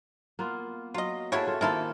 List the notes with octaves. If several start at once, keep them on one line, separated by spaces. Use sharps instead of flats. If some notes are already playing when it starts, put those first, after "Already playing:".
A#3 B3 F4
F#3 F4 D#5
A#3 E4 F#4 G#4 A4 C#5
F4 A4
C3 D#3 A#3 E4 F4 A4